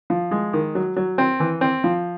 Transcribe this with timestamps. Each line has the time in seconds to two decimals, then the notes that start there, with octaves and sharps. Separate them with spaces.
0.10 F3
0.31 G#3
0.53 D#3
0.75 F#3
0.96 F#3
1.18 C4
1.40 E3
1.61 C4
1.84 F3